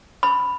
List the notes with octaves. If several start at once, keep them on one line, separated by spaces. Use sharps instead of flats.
B5